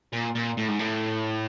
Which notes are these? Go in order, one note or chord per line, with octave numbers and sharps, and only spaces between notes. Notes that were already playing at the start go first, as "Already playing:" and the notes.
A#2
A#2
A2
G#2
A2